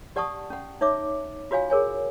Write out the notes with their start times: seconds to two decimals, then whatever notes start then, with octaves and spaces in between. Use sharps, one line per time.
0.16 G4 D5 F#5 A5 C#6 D#6
0.50 C#4 F#5
0.81 D#4 C#5 E5 D6
1.51 F4 F#4 C#5 F5 G#5
1.70 G#4 A#4 C#5 G#5